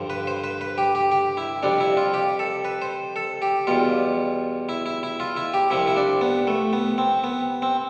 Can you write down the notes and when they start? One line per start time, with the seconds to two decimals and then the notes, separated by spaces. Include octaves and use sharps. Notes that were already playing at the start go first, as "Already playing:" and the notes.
Already playing: G2 D3 F3
0.10 B4
0.27 C5
0.44 B4
0.61 B4
0.78 G4
0.95 G4
1.12 G4
1.37 E4
1.63 F2 C3 G3 D4
1.80 E4
1.97 F4
2.14 G4
2.39 A4
2.65 B4
2.82 C5
3.16 A4
3.42 G4
3.67 E2 B2 G3 F4
4.69 E4
4.86 E4
5.03 E4
5.20 F4
5.36 E4
5.54 G4
5.70 C2 C3 F3 E4
5.87 E4
5.97 D4
6.21 B3
6.47 A3
6.73 B3
6.98 C4
7.24 B3
7.62 C4